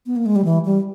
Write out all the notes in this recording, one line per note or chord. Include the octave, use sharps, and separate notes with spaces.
B3
A#3
G#3
G3
E3
G3